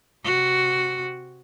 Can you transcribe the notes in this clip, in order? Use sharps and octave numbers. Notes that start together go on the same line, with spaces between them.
C3 F#4